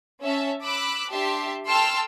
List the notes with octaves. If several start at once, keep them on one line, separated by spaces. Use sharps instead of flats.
C#4 E5 A5
B5 D6 E6 F#6 B6
D4 G4 E5 A5 C6
A4 G5 A5 C6 E6 F6